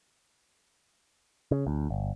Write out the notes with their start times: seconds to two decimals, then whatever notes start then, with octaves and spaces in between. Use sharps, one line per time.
1.51 C#3
1.67 D2
1.90 G1